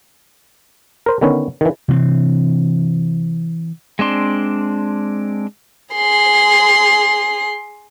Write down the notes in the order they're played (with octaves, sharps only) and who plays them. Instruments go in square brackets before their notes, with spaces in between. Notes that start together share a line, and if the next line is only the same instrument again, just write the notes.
[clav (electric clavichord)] A#4 C5
D3 D#3 B3 C#4
D#3 E3
[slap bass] C3 E3 C4
[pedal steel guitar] G#3 C4 D4 C6
[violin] G#4 C6